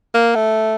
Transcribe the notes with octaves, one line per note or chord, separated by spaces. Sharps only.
A#3
A3